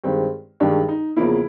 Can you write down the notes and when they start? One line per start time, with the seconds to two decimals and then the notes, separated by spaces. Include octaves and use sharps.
0.04 G2 D#3 G#3 C4
0.60 G2 D#3 G#3 D4
0.89 D#4
1.16 E2 C#3 F3 A#3 E4